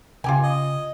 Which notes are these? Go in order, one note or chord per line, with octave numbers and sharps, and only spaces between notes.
C#3 F4 G4 G#5
D#5